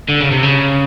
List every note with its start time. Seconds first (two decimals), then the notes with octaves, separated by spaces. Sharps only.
0.09 D3
0.20 C#3
0.32 C3
0.43 C#3